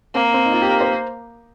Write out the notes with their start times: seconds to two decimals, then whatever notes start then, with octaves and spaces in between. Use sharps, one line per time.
0.15 A#3 C4
0.34 C4
0.45 D#4
0.52 F4
0.62 G4
0.71 A#4
0.81 C5